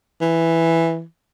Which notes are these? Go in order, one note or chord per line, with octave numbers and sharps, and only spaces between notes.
E3